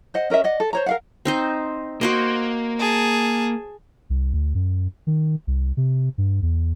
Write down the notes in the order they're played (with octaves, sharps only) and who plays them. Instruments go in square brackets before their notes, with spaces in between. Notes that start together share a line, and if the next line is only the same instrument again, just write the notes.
[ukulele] C5 D#5 F#5
C#4 A#4 D#5 E5
D5 D#5 F#5
A4
C5 C#5 A#5
A#4 F5 F#5
[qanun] C4 D#4 C5
[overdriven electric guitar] A#3 [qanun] F#4 C5 D#5
[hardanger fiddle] G#4 A5
[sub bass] C2
D2
F#2
D#3
C2
C3
G2
E2